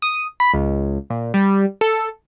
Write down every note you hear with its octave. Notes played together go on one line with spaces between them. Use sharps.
D#6
B5
C#2
A#2
G3
A4